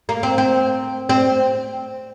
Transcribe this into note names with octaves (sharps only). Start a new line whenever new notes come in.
A#3
C4
C4
C4